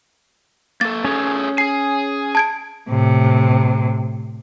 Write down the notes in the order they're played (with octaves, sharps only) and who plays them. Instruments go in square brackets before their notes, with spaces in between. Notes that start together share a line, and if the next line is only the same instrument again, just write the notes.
[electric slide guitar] A#3 A4 [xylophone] A6
[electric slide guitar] A3 G#4 A4 [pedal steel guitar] C#4 C#5
[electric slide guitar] G#4 G#5 [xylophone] C7
[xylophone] A5 G#6 D7
[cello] A2 C3